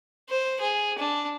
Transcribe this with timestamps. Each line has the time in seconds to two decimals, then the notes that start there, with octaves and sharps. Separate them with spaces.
0.29 C5
0.61 G#4
0.99 D4